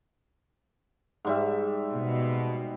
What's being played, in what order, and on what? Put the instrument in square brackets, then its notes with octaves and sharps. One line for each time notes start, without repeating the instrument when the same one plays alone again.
[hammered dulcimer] G#2 G3 E5
[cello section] B2